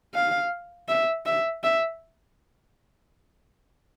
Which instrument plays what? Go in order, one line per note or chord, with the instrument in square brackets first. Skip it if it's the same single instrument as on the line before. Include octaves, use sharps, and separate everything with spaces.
[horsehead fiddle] F5
E5
E5
E5